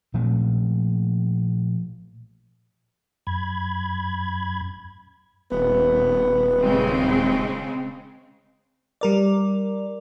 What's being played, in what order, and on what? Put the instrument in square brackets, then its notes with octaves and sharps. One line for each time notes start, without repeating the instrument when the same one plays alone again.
[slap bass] A#2 F3 A3 C4
[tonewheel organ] F#2 B5 G#6
[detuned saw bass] D#1 [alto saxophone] B3
[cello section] C#3 G#3 C4
[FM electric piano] G3 A#4 D5